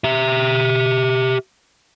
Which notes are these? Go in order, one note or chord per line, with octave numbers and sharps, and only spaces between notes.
G4 E5